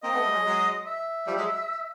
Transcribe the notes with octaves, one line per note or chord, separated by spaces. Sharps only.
A#3 C4 D#5
A3 B3
G3 A3
F#3 G#3
F#3 G#3
E5
F3 G3
F#3 G#3